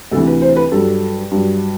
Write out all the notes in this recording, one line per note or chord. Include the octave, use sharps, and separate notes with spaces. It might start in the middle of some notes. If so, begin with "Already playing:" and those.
D2 C3 E3 A4
B4
C5
B4
G2 F#3 A4
G2 F#3